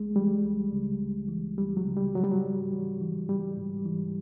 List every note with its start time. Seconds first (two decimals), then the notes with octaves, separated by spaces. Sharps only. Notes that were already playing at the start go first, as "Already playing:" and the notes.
Already playing: C#2 G#3
0.15 E3 G3
0.44 C#2
0.72 C#3
1.01 C#2
1.29 E3
1.58 C#2 G3
1.77 F#3
1.86 C#3
1.96 G3
2.15 G#2 F#3
2.23 G3
2.32 F#3
2.44 G#2
2.73 E3
3.01 E3
3.28 G#2 G3
3.57 G#2
3.86 E3